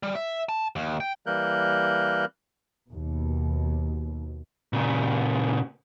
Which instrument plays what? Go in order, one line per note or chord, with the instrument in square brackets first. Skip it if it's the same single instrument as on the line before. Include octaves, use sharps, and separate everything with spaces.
[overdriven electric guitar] G3
E5
A5
D#2
G5
[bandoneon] E3 G3 A#3 A#4 F#6 G6
[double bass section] D#2 B2
[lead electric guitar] A#2 C#3